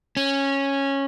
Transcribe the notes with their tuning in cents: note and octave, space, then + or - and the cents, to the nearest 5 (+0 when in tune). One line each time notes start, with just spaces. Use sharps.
C#4 -10